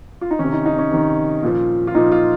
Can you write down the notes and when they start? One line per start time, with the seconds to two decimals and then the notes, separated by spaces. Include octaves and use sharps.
0.21 F4
0.31 D#4
0.39 C3 D#3 C#4
0.52 D#4
0.65 D#4
0.78 C#4
0.91 C3 D#3
1.43 A#2 F3
1.87 F4
1.94 A#2 F3 D#4
2.12 F4